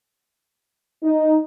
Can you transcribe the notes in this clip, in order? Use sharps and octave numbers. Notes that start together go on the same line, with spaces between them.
D#4